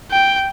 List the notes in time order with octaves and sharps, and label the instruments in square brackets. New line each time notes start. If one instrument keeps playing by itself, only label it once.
[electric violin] G5